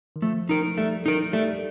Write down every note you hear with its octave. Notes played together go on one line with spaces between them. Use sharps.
D#3
F3 A3
D#4 A#4
G3 A3
D#4 A#4
G3 A3